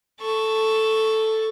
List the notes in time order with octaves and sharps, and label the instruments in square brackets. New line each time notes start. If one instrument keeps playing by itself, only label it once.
[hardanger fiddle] A4 C#6